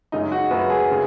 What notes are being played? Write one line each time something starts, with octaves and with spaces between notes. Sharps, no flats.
F#2 C#3 G#3 D#4
F#4
F#2 C#3 G#3 B4
G#4
C#3